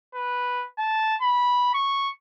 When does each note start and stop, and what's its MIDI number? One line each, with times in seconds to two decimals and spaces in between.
0.15 0.65 71
0.78 1.16 81
1.21 1.72 83
1.74 2.10 85